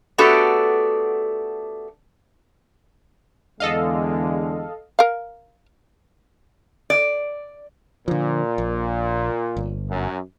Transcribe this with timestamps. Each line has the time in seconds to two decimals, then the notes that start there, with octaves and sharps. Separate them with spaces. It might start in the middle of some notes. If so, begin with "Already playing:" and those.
0.18 A3 B3 D4 F#4 G4 A4
3.60 E2 D3 G#3 A4 D#5 F5
4.99 A#4 F5
6.90 D5
8.08 A#2 D3 F3
8.58 A#1
9.57 G1
9.90 F#2